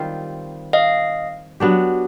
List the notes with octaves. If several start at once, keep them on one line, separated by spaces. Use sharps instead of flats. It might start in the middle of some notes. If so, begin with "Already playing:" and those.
Already playing: D#3 G3 C4 F4
D#5 F5
F#3 B3 D4 G4